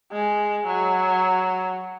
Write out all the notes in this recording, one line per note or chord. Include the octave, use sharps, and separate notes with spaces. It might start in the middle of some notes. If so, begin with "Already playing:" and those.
G#3
F#3